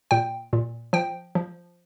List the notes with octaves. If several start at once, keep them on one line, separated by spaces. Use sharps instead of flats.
A#2 G5
A#2
F3 G5
F3